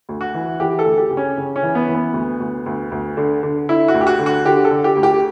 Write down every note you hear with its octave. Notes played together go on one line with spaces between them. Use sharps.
D2
F#4
E3
E3 G4
A4
D2
G4
C#3
C#4
C#3
C#4
E3
B3
E3
B3
D2
D2
D2
D2
D3
D3
D3 E4
F#4
D2
G4
F#4
D3
F#4
D3 G4
A4
D3
G4
D2
G4